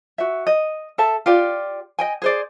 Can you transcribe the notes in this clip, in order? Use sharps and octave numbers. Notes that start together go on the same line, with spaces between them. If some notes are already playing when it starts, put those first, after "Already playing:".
F#4 E5
D#5
A4 E5 A5
F4 G4 D5
D#5 G5 G#5
G#4 C5 D5